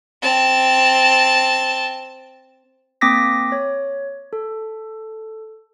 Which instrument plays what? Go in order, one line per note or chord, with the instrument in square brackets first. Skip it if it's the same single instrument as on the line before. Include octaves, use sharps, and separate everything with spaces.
[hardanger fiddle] C4 A5
[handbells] A#3 C4 D6 D#6 A#6 B6
C#5
A4